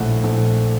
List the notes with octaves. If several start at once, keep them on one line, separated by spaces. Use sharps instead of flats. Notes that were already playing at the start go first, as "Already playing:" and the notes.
Already playing: A#1 A2 A3 F#5
A#1 A2 A3